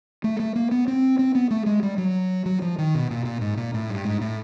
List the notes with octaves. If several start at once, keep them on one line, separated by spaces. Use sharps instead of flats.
A3
A3
A#3
B3
C4
C4
B3
A3
G#3
G3
F#3
F#3
F3
D#3
B2
A#2
A#2
G#2
A#2
A2
G2
G#2
A2